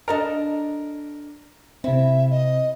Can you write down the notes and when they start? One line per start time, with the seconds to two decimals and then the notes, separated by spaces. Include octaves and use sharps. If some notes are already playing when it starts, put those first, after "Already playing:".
0.08 D4 A4 A#4 D#5
1.84 C3 C4 E4 E5
2.30 D#5